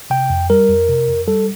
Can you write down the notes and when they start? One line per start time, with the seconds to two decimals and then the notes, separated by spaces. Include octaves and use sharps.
0.10 C3 G5
0.30 F2
0.50 G3 A#4
0.69 F2
0.89 C3
1.08 F2
1.28 G3 A4